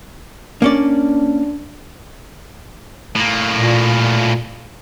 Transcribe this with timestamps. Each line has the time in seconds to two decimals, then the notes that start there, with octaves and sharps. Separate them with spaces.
0.62 A#3 C#4 D4 D5
3.15 A2 A#3
3.55 A#2